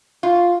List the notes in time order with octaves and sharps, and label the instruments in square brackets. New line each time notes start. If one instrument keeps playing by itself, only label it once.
[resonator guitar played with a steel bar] F4